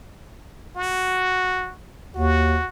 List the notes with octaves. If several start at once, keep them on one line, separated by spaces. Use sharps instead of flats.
F#4
D#2 F#4